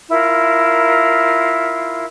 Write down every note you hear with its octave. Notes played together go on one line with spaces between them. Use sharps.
E4 F4 A#4